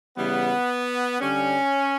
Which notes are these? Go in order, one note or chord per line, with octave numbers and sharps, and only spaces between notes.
C#3 E3 G3 B3
D3 G3 C#4